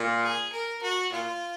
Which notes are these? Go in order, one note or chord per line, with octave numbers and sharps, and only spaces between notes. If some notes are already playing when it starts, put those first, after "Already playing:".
Already playing: A#2
G#4
A#4
F#4
A#2 F4